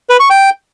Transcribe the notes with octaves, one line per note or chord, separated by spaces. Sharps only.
B4
C#6
G5